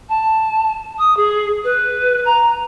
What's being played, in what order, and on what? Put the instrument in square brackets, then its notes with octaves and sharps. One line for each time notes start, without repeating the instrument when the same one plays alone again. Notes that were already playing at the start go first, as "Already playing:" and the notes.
[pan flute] A5
D#6
G#4
B4
A#5